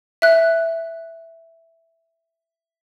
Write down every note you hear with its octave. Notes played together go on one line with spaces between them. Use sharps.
E5 F#6